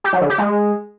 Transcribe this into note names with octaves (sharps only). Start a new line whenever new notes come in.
G4
F#3
D3
G4
G#3